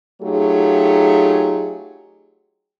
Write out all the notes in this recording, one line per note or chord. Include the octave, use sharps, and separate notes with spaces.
F#3 A3 D#4 F4 G4 G#4